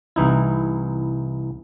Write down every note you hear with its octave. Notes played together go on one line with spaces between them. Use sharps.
C2 E3 D#4 E4